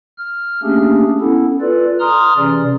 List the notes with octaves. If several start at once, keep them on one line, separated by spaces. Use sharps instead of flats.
F6
A3 A#3 C#4 D4 G4 G#4
B3 C#4 E4 A4
F4 A4 B4 D5
A#5 C6 D#6 F6
C3 E3 C#4 G#4 D5